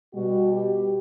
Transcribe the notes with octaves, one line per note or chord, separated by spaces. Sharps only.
B2 G3 F#4
G4